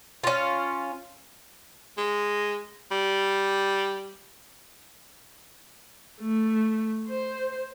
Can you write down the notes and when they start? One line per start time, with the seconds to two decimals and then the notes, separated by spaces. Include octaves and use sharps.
0.24 C#4 F4
1.98 G#3
2.91 G3
6.21 A3
7.09 C5